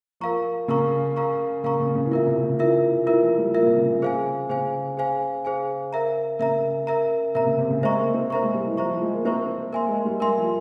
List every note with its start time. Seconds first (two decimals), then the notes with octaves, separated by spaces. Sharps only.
0.20 F3 A#4 F5 A#5 C#6
0.68 C#3 A#4 F5 A#5 C#6
1.16 A#4 F5 A#5 C#6
1.64 C#3 A#4 F5 A#5 C#6
1.80 C#3
1.95 C#3
2.05 E3
2.11 C#3 F4 A#4 E5
2.27 C3
2.43 C#3
2.59 E3 F4 A#4 E5
3.07 E3 F4 A#4 E5
3.22 F3
3.38 G3
3.55 A#3 F4 A#4 E5
3.67 C3
3.79 C#3
3.91 C#3
4.02 G#4 C5 F5 G#5
4.49 C#3 G#4 C5 F5 G#5
4.97 G#4 C5 F5 G#5
5.45 G#4 C5 F5 G#5
5.93 A#4 E5 A#5
6.39 C#3 A#4 E5 A#5
6.87 A#4 E5 A#5
7.35 C3 A#4 E5 A#5
7.47 C#3
7.59 C3
7.70 C#3
7.83 G#3 C5 E5 A#5 C#6
7.98 A#3
8.14 C4
8.30 A#3 C5 E5 A#5 C#6
8.43 G#3
8.54 G3
8.67 E3
8.77 F3 C5 E5 A#5 C#6
8.90 F3
9.02 G#3
9.13 A#3
9.25 C4 C5 E5 A#5 C#6
9.73 A#3 A#4 E5 G#5 C6
9.89 G#3
10.05 G3
10.20 G3 A#4 E5 G#5 C6
10.37 F3